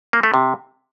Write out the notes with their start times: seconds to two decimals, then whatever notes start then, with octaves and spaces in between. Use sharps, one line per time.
0.13 A#3
0.23 A3
0.34 C3